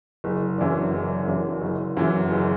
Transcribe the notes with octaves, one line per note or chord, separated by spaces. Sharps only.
F#1
F#2 E3 D4
F#1
F#2 E3 D4
F#1
F#2 E3
F#1